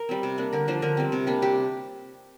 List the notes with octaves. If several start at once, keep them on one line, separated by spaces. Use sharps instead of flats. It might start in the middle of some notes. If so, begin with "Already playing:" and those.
Already playing: A#4
G3 C4
C3
A#3 D4
D3 A#4
F3 A#3 D4 C5
D3 A#4
G3 C4
C3
G3 A#3 D4
C3 G4